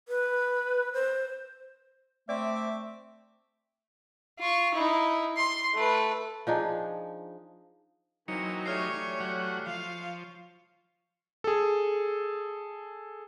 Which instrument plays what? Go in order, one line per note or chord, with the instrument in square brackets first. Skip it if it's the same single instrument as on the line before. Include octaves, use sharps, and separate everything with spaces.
[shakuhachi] B4
C5
[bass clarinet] A3 [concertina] C4 D6 [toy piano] D5 [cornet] E5
[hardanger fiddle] F4 C#6
D#4 E4
C6
A3 B4
[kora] F3 D4 D#4 G#4
[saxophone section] E3 A#3 C4 [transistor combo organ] F#3 D#4 [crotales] C#7
[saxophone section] E3 G3 A3 [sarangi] C#5 [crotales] C#6 F6 C7
[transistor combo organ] F#3 F#5
[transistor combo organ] F3 [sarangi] F5
[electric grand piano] G#4 A4